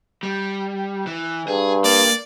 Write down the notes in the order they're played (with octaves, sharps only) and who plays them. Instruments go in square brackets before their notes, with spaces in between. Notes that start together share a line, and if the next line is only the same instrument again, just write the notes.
[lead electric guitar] G3
E3
[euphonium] G2 [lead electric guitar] G#4
[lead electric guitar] A#3 [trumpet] D5